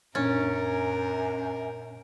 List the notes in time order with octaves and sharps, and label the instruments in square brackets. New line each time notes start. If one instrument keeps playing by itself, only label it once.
[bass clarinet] F#2 [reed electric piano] A#2 D4 A6 [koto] C#4 [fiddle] A#4